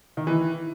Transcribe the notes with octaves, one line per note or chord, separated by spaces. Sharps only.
D#3
E3